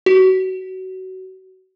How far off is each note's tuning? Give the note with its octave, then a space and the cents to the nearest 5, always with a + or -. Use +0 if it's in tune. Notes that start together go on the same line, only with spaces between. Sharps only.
F#4 +25